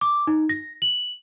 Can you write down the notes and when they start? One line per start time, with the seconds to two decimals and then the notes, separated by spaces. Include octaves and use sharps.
0.01 D6
0.27 D#4
0.49 A#6
0.82 F#7